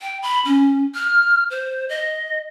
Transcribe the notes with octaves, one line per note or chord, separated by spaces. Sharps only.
G5
B5
C#4
F6
C5
D#5